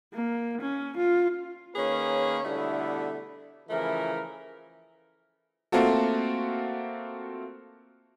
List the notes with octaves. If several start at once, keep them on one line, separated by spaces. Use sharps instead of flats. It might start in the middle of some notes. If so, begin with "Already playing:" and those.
A#3
C#4
F4
D#3 A#3 C#4 G#4 B4 C#5
B2 D3 G3 A3 B3 E4
C#3 E3 F3 A3 E4 A#4
A3 A#3 C4 F4 F#4 A4